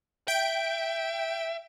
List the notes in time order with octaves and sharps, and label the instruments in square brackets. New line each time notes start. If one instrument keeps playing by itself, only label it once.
[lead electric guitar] E5 [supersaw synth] G5 D7